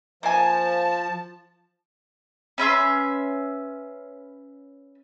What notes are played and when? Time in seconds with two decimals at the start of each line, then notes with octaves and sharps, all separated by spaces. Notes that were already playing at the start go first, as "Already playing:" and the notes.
0.23 F3 A#3 G#5 A5
2.58 C#4 B4 E5 C6